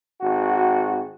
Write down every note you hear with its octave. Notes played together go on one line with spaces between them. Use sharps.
G#1 F#4